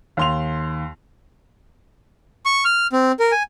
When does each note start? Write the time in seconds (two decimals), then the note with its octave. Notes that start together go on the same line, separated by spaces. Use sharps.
0.17 D#2 C6 F7
2.46 C#6
2.65 F6
2.93 C4
3.19 A#4
3.32 G#5